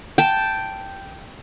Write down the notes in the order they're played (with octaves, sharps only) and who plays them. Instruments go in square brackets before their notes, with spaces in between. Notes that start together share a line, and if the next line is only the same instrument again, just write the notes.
[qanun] G5 A5